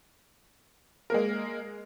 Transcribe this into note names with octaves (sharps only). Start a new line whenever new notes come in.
G#3 A#3 A#4